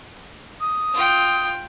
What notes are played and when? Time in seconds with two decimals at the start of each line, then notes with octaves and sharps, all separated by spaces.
0.61 D#6
0.94 F4 G5